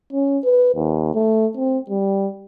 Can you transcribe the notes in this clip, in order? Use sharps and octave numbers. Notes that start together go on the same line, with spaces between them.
C#4
B4
D#2
A3
C4
G3